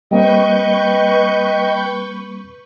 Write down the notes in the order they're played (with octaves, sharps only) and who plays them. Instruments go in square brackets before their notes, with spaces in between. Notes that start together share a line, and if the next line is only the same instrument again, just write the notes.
[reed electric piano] G3 A#3 C4 [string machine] B4 C#6 G6 [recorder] D#5 [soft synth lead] G5